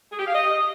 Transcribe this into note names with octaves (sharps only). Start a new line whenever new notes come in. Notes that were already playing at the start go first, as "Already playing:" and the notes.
G#4
G4
F5
D#5